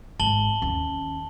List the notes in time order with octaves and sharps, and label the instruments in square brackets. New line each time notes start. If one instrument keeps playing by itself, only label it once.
[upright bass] G#1 [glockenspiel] A5 F#7 G7
[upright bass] D#2 C#4